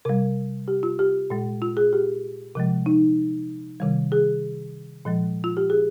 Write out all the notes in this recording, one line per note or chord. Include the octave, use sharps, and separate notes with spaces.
C3 G3 A#4
G4
F4
G4
A#2 G#3
F4
G#4
G4
C3 F3 G#3
D#4
C3 D#3 G3
G#4
A#2 F3 G#3
F4
G4
G#4